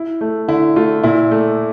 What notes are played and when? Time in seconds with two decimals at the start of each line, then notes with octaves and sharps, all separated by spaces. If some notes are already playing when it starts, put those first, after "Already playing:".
Already playing: E4
0.21 A3
0.48 D3 E4
0.76 A3 F4
1.04 A#2 E4
1.31 A3